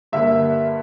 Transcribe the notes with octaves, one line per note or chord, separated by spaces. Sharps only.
G2 D3 G3 A#3 E5